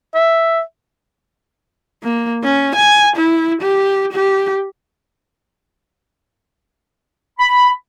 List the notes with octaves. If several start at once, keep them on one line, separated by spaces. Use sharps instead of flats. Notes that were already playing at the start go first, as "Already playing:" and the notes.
E5
A#3
C#4
G#5
E4
G4
G4
B5